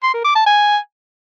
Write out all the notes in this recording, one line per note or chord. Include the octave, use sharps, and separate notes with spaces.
C6
A#4
D6
A5
G#5